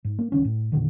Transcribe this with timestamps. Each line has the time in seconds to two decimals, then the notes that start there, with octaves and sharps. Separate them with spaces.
0.05 G#2
0.19 A#3
0.32 D1 D3 D#3 C#4
0.45 A2
0.72 E2 A#2 D3 D#3